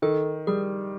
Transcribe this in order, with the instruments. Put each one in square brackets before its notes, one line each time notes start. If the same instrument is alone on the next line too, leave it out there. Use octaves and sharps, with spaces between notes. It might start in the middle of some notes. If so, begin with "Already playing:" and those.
[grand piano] D#3 [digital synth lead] A4
[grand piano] G3 [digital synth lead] G#4